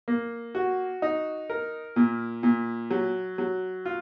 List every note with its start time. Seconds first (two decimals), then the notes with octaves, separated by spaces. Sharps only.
0.08 A#3
0.55 F#4
1.02 D#4
1.50 A#4
1.96 A#2
2.43 A#2
2.91 F#3
3.38 F#3
3.85 F4